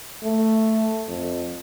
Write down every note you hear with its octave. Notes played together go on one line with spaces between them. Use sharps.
A3
F2